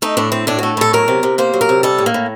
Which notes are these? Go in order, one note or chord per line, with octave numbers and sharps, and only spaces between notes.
A3 D#4
A2 D4
A3 C4
A2 D4
A3 F#4
A2 A4
F#3 A#4
C3
C3
A#3 C5
F#3
A#4
C3
G3 A4
A2
A#3
A2